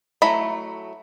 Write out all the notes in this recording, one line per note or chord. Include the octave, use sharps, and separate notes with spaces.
F#3 A3 E4 A#5 B5